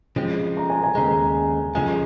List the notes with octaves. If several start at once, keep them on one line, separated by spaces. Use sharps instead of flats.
C#3 F3 G#3 C4
A#5
G#5
G#5
D#2 C#3 G#3 A#5
C#2 C#3 F3 G#3 G#5